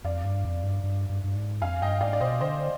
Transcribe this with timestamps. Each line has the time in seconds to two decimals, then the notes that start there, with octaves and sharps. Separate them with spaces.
0.04 F2 D5 F5
0.24 G2
0.45 F2
0.63 G2
0.84 G2
1.09 G2
1.24 G2
1.35 G#2
1.62 F2 F5 G#5
1.82 G2 D#5 G5
2.01 G#2 D5 F5
2.13 D5
2.20 B2 C5 D#5
2.41 D3 C5 D#5